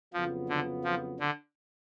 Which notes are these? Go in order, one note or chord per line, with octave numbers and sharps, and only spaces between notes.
F2 C#3 F3 F#3 B3 F4
D3
F3
D3